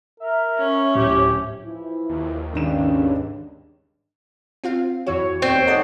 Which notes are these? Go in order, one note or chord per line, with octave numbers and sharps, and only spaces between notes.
A#4 E5
C#4
D1 G4
E3 F3 E4
D#2
G#1 G2 C#3 D4 E7
C4 F4 F5
F2 E3 F#4 C#5
D#2 C4 G5
G#2 A4 D5 D#5 F#5 A5